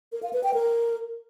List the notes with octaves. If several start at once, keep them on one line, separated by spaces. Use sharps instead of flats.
A#4
F5
B4
G5
A#4